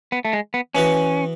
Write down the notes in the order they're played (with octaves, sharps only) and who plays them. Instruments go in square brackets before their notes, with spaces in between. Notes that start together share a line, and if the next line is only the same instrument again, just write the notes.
[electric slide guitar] B3
A3
G#3
B3
[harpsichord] E3 B3 F#4 [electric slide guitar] C#4